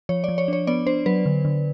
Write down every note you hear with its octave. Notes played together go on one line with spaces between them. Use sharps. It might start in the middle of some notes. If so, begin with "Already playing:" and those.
F3 C#5
F3 D5
C#5
D4 C#5
B3 D5
D4 C5
F#3 B4
D3
D3